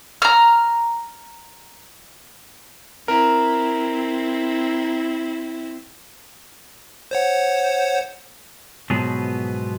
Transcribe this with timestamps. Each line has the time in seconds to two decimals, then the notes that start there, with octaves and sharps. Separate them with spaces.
0.22 A#5 F6
3.08 C4 E4 A#4
7.11 C5 C#5 F#5
8.90 G#2 B2 F3 F#3 B3 G#4